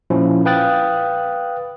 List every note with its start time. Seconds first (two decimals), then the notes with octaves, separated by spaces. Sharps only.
0.10 A#2 F3 C#4 E4
0.45 B4 F5 G5 D#6 F#6 A6